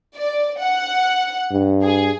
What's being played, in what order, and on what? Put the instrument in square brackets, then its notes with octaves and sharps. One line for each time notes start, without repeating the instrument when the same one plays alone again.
[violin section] D5
F#5
[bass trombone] G2
[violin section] G#4